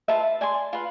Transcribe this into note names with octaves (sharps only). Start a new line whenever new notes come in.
F4 B4 E5 A5
D5 G#5 C6
F4 B4